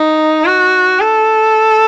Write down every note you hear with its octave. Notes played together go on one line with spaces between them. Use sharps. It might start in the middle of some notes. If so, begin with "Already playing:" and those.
Already playing: D#4
F#4
A4